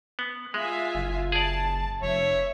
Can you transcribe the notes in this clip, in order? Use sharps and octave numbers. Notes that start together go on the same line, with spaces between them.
B3
G#3 F4 E5 G#5
F#1
G#4 D5 A5
F1 C#5 E5